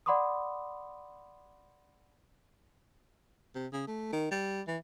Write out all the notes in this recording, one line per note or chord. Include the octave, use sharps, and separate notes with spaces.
D5 F#5 B5 C6 D6 D#6
C3
C#3
A3
D#3
G3
E3